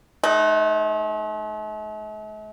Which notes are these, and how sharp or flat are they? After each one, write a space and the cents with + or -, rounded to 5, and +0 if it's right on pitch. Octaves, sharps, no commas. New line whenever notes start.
A3 -45 D#4 +0